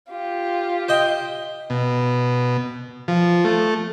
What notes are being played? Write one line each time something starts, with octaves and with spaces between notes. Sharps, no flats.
F4 G4
C5 D#5 G5
B2
F3
A3